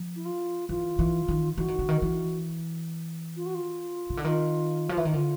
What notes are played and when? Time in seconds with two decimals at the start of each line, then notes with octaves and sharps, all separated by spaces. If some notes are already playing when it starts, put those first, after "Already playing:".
Already playing: F3
0.16 E4
0.25 F4
0.69 E3 F4
0.99 E3
1.28 D#3
1.57 E3 F#4
1.68 D#3
1.79 D3
1.89 D#3
2.02 E3
3.36 F4
3.46 F#4
3.54 F4
4.10 C#3
4.17 D3 E4
4.24 D#3 F4
4.89 F3
4.97 E3
5.05 D#3
5.13 D3 F4